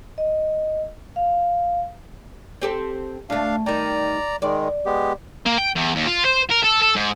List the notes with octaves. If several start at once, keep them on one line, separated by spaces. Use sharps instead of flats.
D#5
F5
C4 G4 A4
D2 A3 D4 F5
D#3 G3 D5 A#5
D#3 G#3 D5
G#3 B3 G4
A#3
G5
E2
D#2
F4
C5
A#4
A4
A4
G#2